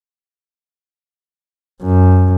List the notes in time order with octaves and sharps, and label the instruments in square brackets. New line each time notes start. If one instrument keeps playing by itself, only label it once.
[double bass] F#2